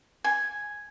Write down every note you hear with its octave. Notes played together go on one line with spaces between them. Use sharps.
G#5